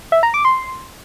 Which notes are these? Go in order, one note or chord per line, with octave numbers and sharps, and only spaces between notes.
E5
A#5
D6
C6